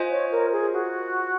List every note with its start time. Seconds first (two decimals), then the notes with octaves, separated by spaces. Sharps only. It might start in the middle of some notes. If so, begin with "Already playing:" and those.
Already playing: F4 C5 D#5 G#5
0.10 C#5
0.31 A#4
0.52 G#4
0.73 F#4